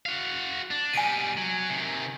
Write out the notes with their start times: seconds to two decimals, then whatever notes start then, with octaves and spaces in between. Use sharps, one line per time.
0.06 F#4 F5
0.71 D4
0.93 B2 G3 G#5 D7 D#7
1.37 F#3
1.70 C3 D#3